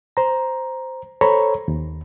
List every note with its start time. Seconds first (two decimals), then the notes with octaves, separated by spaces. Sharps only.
0.17 C5 A#5
1.21 A4 C5 C#5 A#5 B5
1.68 D#2